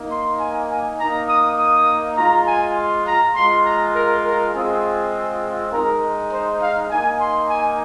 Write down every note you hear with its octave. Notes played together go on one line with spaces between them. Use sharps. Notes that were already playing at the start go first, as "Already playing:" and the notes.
Already playing: A#3 D#4
C6
G#5
G#5
A#3 D#4 A#5
D#6
D#6
G#3 F4 A#5
G#5
C6
A#5
G#3 F4 C6
A#5
A#4
A#4
G#3 C4 F4 G#4
G#3 D#4 A#4
C5
F5
A#3 D#4 G#5
C6
G#5